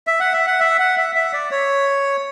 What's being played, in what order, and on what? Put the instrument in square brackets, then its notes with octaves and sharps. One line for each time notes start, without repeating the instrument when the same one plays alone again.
[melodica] E5
F#5
E5
F#5
E5
F#5
E5
E5
D5
C#5